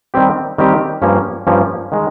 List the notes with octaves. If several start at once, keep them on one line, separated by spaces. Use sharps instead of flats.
D#3 G3 C4 G4
D#3 G3 C4 G4
G2 F3 A#3 C#4 G4
G2 F3 A#3 C#4 G4
D#3 G#3